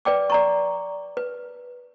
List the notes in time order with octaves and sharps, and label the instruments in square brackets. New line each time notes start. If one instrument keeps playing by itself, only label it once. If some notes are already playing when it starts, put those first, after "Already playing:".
[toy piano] B4 D5 G5 D6
D5 A#5 C#6
B4